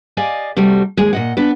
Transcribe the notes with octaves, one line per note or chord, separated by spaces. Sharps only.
G4 D5 D#5 F5 G#5
C3 G3 A3 F#4
D#2 G#3 G#4
A#2 D#5 F#5
B3 D4 B4